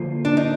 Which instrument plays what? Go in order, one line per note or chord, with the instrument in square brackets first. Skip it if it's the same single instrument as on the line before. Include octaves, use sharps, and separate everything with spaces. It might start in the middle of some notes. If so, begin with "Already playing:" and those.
Already playing: [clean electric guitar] D3 F3 A#3 F4 C5
[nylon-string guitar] D4
D#4